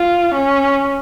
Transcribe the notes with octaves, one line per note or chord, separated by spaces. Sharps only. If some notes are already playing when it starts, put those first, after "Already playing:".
Already playing: F4
C#4